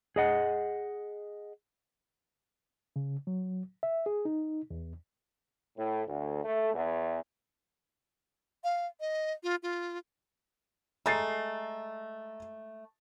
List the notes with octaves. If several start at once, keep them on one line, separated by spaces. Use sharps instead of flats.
G#4 D#5 F#5
C#3
F#3
E5
G#4
D#4
E2
A2
D2
A3
E2
F5
D#5
F4
F4
G#3 A3 A#5 A6 C7